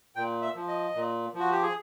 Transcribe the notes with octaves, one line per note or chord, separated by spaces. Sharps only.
A#2 G5
E5
F3
D#5
A#2
F3
F#4
G4
G#4